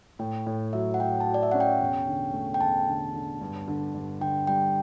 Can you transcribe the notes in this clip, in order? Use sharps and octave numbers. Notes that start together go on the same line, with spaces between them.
A2 G5
A2
F#3 E5
F#5
F#3 G5
A5
F#4
D5
E5
C#4 F#5
G5
E1
D3
A3
G5
E1 A5
D3
D3
G2
D3
G2
D3 G5
G3 G5